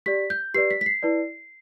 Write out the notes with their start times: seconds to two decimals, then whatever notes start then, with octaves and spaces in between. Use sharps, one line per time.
0.06 G4 D5 B6
0.30 G6
0.54 G4 B4 D5 C7
0.71 B6
0.81 B6
0.86 C7
1.03 E4 B4 D5